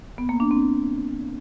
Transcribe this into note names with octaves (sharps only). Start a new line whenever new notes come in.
B3
A#3
D4
C4